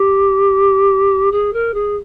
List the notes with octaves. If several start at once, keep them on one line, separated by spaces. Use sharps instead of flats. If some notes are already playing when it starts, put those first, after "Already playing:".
Already playing: G4
G#4
A#4
G#4